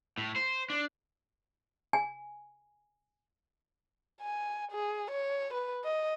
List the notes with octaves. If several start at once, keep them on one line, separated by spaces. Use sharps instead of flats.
A2
C5
D4
G#5
G#5
G#4
C#5
B4
D#5